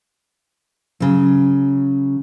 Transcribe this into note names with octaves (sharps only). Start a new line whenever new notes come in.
C#3 F#3